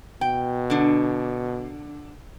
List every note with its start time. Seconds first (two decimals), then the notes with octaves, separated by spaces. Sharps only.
0.21 B2 G5
0.70 D3 D4